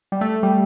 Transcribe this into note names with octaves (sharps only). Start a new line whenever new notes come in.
G3
A3
G3